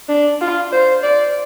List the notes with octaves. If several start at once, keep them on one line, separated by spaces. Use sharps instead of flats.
D4
F4
C5
D5